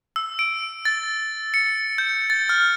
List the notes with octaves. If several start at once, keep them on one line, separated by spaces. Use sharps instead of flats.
E6
D7
A6
C#7
G6
A6
F6